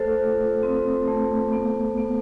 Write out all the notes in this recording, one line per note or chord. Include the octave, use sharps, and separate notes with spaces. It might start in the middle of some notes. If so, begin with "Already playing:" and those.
Already playing: A3 A4 C5
F4
C4
A3
B3
B3